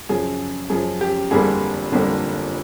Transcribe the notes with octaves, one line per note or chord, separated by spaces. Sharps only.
F#2 C#3 F3 G#4
F#2 C#3 F3 G#4
G4
G1 F2 D3 G3 A#3 G#4
G1 F2 D3 G3 A#3